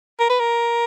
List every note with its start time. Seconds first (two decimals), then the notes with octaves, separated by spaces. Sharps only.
0.20 A#4
0.29 B4
0.39 A#4